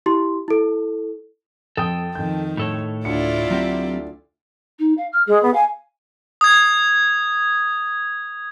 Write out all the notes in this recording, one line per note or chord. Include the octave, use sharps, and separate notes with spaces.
E4 G4 C6
E4 A4
F2 A4 G5 D#6
F2 D#3 G6
A2 A4 C#5
D2 E4 F4 D5 C#7
F#3 C4 G4
D#4
F5
F6
G#3 G#4
B3
F5 G#5
D#6 G#6